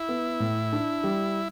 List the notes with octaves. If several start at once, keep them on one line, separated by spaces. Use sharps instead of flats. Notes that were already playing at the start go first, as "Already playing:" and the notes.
Already playing: E4
B3
A2
D4
G3